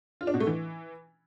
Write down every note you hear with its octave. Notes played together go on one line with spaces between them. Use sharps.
F4
D4
B2
A3
E3